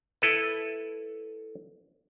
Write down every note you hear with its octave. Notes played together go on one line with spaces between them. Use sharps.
E4 A4 B4